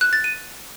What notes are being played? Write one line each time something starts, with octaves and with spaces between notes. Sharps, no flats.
F#6
A6
D#7